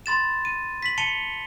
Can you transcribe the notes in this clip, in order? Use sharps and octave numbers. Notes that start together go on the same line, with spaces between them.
B5 C6 A6 E7
D#7
B6 F#7
A5 C#7 D#7 F7 G7